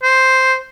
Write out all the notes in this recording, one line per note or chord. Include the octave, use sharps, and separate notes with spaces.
C5